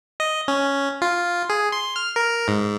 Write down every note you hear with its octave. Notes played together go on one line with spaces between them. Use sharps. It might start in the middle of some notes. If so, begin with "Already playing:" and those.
D#5
C#4
F4
G#4
C6
F6
A#4
G#2